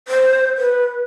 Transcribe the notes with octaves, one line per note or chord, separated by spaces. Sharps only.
C5
B4